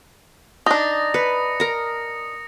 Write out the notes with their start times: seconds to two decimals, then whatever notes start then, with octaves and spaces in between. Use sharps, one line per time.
0.66 D4 D#4 D#6 A#6
1.14 B4 C#7
1.60 A#4 A#5